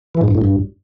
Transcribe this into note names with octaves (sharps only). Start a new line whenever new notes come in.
E3
G#2
G2
A2
G2